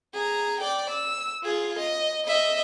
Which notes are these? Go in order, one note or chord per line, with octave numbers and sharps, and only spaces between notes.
G#4 A#5
D5 G5
E6
F4 G#4
D#5
D#5 E5